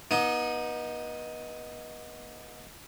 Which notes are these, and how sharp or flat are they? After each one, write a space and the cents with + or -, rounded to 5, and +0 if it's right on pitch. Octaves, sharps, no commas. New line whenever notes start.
B3 -30 D#4 +10